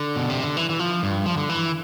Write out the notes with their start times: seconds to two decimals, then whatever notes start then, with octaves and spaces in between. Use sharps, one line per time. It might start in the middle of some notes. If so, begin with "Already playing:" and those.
Already playing: D3
0.16 B2
0.30 C3
0.43 D3
0.57 E3
0.69 E3
0.79 F3
1.03 G2
1.26 F3
1.38 D3
1.49 E3